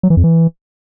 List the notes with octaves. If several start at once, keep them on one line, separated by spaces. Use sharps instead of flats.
F#3
E3
F2
E3